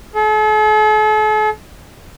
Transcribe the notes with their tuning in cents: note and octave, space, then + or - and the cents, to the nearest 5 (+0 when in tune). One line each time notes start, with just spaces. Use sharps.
A4 -45